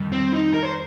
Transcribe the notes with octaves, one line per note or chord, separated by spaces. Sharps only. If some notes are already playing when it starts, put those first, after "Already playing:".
Already playing: F2 D#3 G3
C4
D#4
A#4
C5